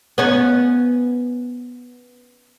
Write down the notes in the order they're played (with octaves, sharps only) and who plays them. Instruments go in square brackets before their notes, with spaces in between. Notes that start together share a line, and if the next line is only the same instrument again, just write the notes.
[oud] B3 C#4